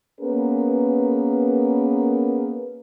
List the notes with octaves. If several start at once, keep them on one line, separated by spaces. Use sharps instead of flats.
A#3 B3 C#4 G#4 A#4 B4